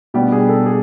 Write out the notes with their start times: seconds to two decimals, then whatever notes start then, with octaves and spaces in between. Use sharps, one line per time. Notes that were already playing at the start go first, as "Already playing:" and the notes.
0.14 B2 G3 B3 D4 G4
0.32 G#4
0.49 A4
0.66 G#4